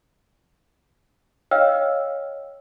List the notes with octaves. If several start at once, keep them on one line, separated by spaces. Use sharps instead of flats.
C#5 D#5 F5 G5 E6 F6